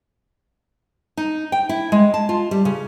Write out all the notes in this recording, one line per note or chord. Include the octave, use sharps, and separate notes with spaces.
D#4
G5
E4
G#3
A5
F4
G3
C#3